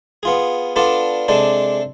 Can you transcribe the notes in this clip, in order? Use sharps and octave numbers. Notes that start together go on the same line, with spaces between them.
B3 F4 G#4
B3 D4 F4 A4 D5
C3 G#3 D4 A4 D5